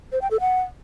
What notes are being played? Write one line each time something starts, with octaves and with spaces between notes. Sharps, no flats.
C5
G5
A4
F#5